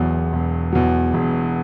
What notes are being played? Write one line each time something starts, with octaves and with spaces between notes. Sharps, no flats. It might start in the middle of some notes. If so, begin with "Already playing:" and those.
Already playing: E1 E2 B2 F#3
E1
E2 B2 F#3
E1